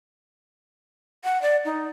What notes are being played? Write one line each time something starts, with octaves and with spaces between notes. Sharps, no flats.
F#5
D5
D#4